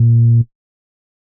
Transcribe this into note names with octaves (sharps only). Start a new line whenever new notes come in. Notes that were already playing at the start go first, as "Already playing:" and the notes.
Already playing: A#2